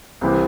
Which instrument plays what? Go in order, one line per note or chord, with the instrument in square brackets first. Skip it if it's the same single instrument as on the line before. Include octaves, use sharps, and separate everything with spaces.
[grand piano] C2 C3 E3 C4 G4